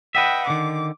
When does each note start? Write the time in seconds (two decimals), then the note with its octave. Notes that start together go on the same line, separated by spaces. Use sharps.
0.15 B4 D#5 E5 F#5 G5
0.47 D3 D#3 D6